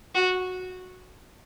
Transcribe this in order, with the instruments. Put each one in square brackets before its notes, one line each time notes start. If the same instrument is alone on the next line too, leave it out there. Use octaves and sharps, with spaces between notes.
[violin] F#4